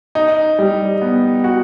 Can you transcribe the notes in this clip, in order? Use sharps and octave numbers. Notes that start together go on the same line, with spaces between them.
D#4
G3
B3
F#4